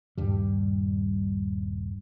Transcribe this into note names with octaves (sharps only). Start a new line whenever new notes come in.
D#1 G2 G3